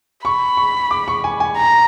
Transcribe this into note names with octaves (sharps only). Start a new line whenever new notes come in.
B5 C#6
C#6
D6
C#6
G#5
G#5
A#5